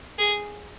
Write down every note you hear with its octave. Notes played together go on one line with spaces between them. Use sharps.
G#4